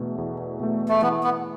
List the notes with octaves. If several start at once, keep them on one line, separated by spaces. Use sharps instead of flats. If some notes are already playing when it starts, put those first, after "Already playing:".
Already playing: E2 B2 A3
E2
B2 A3
A3
E3 B3
B3